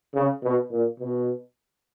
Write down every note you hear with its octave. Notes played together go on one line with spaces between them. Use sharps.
C#3
B2
A#2
B2